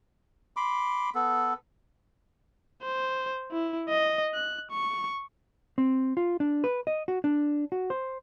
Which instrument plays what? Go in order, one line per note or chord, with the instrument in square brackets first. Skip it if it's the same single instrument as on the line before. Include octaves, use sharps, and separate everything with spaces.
[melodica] B5 C6 D6
B3 A4
[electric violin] C5
E4
D#5
F#6
C#6
[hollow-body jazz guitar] C4
F4
D4
B4
D#5
F#4
D4
F#4
C5